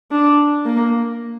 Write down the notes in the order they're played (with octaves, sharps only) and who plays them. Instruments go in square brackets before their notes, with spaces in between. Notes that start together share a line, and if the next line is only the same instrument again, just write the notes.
[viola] D4
A#3